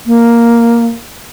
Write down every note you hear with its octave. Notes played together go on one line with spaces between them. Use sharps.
A#3